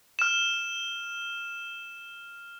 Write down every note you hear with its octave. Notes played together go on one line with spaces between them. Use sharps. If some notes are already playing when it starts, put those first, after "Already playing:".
F6 E7